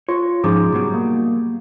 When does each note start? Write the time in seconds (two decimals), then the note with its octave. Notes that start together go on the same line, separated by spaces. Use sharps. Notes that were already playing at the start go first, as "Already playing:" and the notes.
0.09 F4 C#5
0.44 G#2 F3 C#4 D#4 G#4 D6
0.72 B2 F#3 G3
0.94 A#3